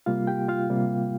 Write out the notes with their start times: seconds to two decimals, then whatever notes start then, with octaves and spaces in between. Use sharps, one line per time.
0.06 C3 G3 A#3 F4 F5
0.27 G4 G5
0.49 F4 F5
0.70 C3 G3 A#3